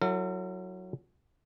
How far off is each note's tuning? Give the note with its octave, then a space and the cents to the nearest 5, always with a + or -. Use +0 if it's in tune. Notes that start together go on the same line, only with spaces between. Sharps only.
F#3 +0 E4 +0 A#4 -45